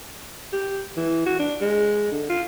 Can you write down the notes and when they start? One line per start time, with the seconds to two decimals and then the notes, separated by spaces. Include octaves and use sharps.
0.53 G4
0.97 E3
1.26 F#4
1.39 D4
1.61 G#3
2.12 D3
2.30 F4